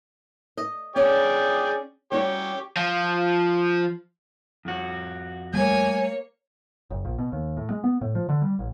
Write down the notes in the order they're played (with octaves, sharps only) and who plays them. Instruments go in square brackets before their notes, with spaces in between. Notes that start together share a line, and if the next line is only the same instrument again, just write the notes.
[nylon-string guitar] D#5
[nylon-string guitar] C#4 D4 [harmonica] G#4 D5 G5
[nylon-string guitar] G3 C#4 F#4 [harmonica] G4 C#5
[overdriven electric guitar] F3
[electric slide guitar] F2 F#4
[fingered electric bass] G3 A3 [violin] A#3 C#5 [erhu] G#5
[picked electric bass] F#1
A#1
B2
D#2
A2
G#3
B3
A2
F3
D3
G3
A1